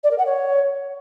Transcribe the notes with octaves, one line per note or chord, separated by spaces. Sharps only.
D5
A#4
F#5
C#5